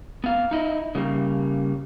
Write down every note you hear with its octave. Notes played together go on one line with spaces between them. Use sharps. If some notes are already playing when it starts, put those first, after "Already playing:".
B3 F5
D#4 E4 D#5
C#3 G3 A#3